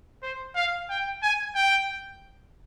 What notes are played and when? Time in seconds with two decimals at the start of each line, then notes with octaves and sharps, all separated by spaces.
0.22 C5
0.55 F5
0.89 G5
1.22 G#5
1.55 G5